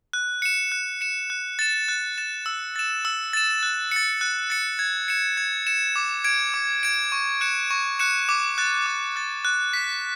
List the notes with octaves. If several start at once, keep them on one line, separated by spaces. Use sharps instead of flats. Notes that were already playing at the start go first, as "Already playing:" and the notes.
F#6
C#7 E7
F#6
C#7 E7
F#6
A6 E7
F#6
A6 E7
E6
A6 E7
E6
A6 E7
F#6
A6 C#7
F#6
A6 C#7
G#6
C#7 E7
G#6
C#7 E7
D6
G#6 D7
D6
G#6 D7
C#6
F#6 C#7 E7
C#6
F#6 C#7 E7
D6
F#6 A6
D6
F#6 A6
F#6
B6 E7